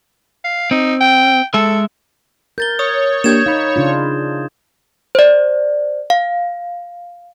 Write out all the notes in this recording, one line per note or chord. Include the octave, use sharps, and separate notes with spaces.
F5
C4 D#4
G5
G#3 A4 E5
A#4 G6 A6 G7
C#5 D#6
A#3 D4 G4 G6 G#6 E7
D#4 F5 B5
C#3 D4 F4
C5 D5
F5